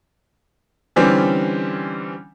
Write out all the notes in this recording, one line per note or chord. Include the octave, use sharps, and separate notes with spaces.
D3 E3 G3 C4 C#4